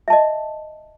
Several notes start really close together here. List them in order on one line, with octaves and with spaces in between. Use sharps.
E5 A5 D#5